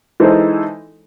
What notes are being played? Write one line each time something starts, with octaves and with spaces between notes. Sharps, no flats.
E3 G#3 D#4 A4 C5